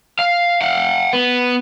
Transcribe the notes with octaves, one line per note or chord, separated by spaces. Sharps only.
F5
F5 F#5
B3